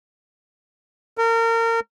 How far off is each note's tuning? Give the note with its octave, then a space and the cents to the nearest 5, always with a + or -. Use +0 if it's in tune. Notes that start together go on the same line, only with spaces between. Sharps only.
A#4 -30